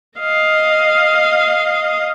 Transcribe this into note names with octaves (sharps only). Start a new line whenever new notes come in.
D#5 F5